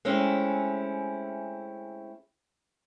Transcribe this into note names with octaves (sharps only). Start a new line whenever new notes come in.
G#3 A3 C4 C#4 E4